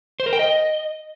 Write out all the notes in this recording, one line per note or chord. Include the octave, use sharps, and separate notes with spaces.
C5
A#4
G5
D#5